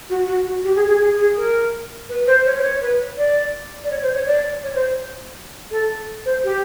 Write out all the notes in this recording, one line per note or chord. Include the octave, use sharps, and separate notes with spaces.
F#4
F#4
F#4
G4
G#4
G#4
G#4
G#4
A#4
B4
C5
C#5
C5
C#5
B4
D5
D5
C#5
C5
C#5
D5
C#5
C5
A4
C5
G4